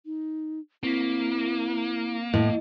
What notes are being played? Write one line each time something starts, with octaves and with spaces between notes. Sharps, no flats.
D#4
A#3 C4 E4 B6
A2 D#5